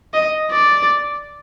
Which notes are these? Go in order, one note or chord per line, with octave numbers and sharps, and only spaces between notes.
D#5
D5